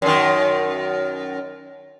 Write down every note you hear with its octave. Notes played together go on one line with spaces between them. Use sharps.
F#2 D#3